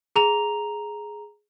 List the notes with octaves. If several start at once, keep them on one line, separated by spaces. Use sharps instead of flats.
G#4 A#5 F7